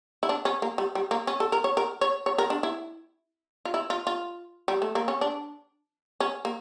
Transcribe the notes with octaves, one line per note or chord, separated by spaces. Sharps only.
E4
D4
C#4
A#3
G3
G3
A#3
C#4
A4
A#4
C#5
A#4
C#5
C#5
A#4
D4
E4
F4
E4
F4
F4
G3
A3
A#3
C#4
D4
C#4
A#3